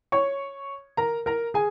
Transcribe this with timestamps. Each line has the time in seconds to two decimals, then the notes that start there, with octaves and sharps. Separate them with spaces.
0.12 C#5 C#6
0.97 A#4 A#5
1.26 A#4 A#5
1.54 G#4 G#5